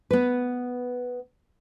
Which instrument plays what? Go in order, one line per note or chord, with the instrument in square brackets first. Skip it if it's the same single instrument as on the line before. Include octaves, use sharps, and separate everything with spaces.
[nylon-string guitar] B3 B4